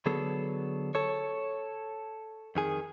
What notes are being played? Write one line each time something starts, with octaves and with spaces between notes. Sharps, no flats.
D3 F#3 B3 G#4 A4
A4 C#5
F2 D#3 G#4